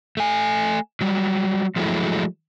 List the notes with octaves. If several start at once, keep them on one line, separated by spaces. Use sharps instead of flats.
A3 G#5
F#3 G3
F3 F#3 G#3 A3 E4